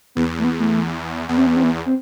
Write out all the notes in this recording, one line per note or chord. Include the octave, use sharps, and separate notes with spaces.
E2 B3
A3
B3
A3
E2 B3
C4
B3
C4
B3
C4